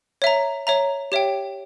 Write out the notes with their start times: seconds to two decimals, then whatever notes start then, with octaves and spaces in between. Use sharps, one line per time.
0.22 C#5 E5 A#5
0.67 C#5 E5 A#5
1.12 G4 C#5 E5 G5